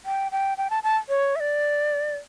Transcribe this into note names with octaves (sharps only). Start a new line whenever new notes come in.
G5
G5
G5
A5
A5
C#5
E5
D5